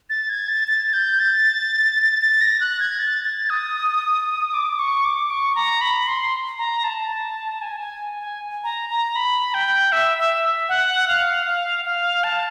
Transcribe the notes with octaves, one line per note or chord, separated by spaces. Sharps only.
A6
G#6
A6
A6
G6
A6
A6
A#6
F#6
G#6
A6
A6
D#6
D6
C#6
D6
C#6
A#5
B5
C6
A#5
A5
G#5
G#5
G#5
A#5
A#5
B5
G5
E5
E5
F#5
F5
F5
F5
A5